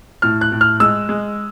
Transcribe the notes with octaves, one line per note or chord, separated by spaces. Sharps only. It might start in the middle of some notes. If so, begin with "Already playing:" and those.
A2 F6
F#6
A2
F6
G#3 E6
G#3